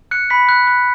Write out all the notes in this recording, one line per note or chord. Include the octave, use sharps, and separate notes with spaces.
F#6 C#7
B5 B6
F#6
F#6